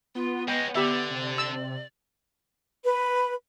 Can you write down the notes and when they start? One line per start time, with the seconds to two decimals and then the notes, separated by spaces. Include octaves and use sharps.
0.15 B3 F4
0.48 G#3 C#4 D#5 G5
0.75 D3 G4 D5 E5
1.11 C3
1.38 E6
2.84 B4